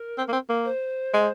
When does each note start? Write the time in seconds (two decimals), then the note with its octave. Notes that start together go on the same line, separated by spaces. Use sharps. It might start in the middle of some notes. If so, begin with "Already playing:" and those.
Already playing: A#4
0.18 C4
0.28 A#3
0.33 C4
0.49 A#3
0.65 C5
1.13 G#3